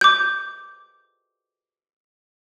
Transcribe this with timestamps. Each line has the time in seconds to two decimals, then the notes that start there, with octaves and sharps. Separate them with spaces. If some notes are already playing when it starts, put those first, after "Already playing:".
0.01 D6 G6